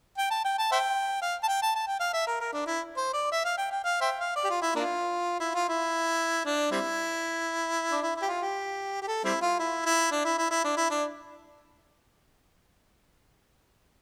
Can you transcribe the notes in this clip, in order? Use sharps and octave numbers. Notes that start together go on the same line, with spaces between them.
G5
A5
G5
A5
C5 E5 G5
F5
A5
G5
A5
A5
G5
F5
E5
A#4
A#4
D4
E4
C5
D5
E5
F5
G5
G5
F5
C5 E5 G5
F5
D5
G4
F4
E4
A#3 D4 F4
E4
F4
E4
D4
G3 C4 E4
D4
E4
E4
G4
F4
G4
G4
A4
G3 C4 E4
F4
E4
E4
D4
E4
E4
E4
D4
E4
D4